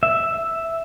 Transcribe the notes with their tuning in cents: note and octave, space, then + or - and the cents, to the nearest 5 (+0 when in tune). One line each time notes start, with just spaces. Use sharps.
E5 +0